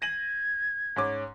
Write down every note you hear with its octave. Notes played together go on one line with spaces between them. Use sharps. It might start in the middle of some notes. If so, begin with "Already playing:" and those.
G#6 A#6 D#7 F#7
G#2 C#4 D6